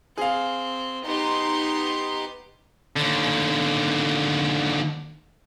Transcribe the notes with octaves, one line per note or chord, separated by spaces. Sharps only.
C4 G#4 F5
B3 D#4 G4 C6
D#2 D3